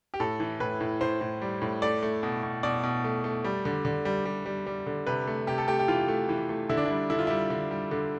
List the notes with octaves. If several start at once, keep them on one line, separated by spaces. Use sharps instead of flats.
G4
A2 A4
E3
A2 B4
A2
A2 C5
A2
G3
A2
A3 D5
A3
B2
B2
B2 D5
B2
A3
A3
G3
D3
D3
G3
G3
G3
G3
D3
C3 B4
A3
C3 G4
A4
A3 G4
G4
E3 F4
A3
E3
A3
D3 E4
D4
G3 E4
D3 E4
F4
G3 E4
D3
G3
D3